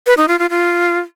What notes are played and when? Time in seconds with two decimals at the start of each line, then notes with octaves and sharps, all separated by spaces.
0.06 B4
0.17 D#4
0.28 F4
0.39 F4
0.50 F4